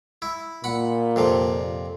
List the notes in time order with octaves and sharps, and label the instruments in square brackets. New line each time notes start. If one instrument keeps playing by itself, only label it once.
[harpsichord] E4
[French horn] A#2 [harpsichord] F#5 B5
[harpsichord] F2 C3 F3